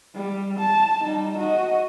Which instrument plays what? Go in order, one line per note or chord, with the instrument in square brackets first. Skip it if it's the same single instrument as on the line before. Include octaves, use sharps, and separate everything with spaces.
[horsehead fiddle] G3
A5
G3 D#4
F#4 D#5